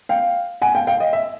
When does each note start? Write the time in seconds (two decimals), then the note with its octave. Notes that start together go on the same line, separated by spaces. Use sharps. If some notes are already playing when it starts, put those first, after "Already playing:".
0.09 F5 G5
0.62 F#5 G#5
0.75 F5 G5
0.87 F5 G5
1.00 D#5
1.13 E5